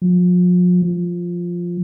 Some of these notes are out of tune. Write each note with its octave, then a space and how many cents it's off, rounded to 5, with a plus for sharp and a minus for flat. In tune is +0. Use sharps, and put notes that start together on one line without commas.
F3 +40
F3 +0